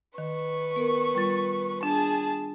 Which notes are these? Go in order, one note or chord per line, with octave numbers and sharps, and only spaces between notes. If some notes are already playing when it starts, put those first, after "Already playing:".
D#3 B4 C#6
B3 A#4
G3 F4 A6
D4 G#4 A5